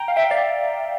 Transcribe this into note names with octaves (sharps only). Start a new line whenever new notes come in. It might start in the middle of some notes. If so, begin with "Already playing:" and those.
Already playing: G5 A#5
F5
E5 G5
D5 F5